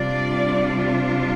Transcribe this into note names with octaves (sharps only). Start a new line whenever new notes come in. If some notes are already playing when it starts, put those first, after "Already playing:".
Already playing: C3 G3 D4 F4 D5